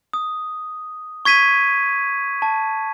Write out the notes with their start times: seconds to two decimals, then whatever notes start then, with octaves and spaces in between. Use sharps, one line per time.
0.13 D#6
1.25 C#6 G#6 B6 D#7
2.42 A5